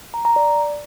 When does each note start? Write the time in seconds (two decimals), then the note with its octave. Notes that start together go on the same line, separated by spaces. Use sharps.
0.14 A#5
0.25 A#5
0.36 D5